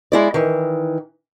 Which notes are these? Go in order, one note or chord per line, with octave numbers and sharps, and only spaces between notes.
G#3 E4 D5
D#3 E3